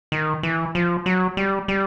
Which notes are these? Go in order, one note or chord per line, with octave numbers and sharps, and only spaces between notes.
D#3
E3
F3
F#3
G3
G3